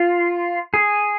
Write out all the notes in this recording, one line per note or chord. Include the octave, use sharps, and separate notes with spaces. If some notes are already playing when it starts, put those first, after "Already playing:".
Already playing: F4
G#4